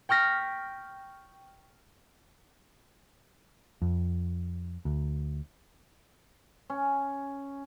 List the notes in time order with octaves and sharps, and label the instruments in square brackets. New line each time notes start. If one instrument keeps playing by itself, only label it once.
[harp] G5 C#6 F6 A#6 B6
[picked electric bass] F2
D2
[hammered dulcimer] C#4